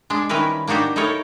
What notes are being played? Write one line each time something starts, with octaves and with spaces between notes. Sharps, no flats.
G#3 D4
D#3 G3 C#4 E4 A#4 B4
A#3 D4 D#4 F#4 G4
D#4 E4 A4 A#4 C#5